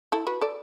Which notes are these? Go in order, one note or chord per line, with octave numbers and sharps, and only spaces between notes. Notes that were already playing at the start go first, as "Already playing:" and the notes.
E4 A4
F#4 B4
A4 D5